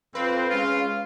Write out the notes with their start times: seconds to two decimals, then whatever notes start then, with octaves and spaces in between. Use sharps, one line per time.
0.15 F2 C4 B4 F5
0.50 G#3 C#4 F4